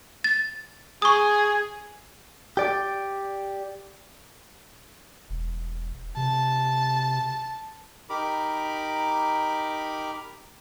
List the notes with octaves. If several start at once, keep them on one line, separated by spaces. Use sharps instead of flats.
A6
G#4 C#6 D#6
G4 D5
E1
C3 A5
D#4 G4 A#4 A#5 B5 D6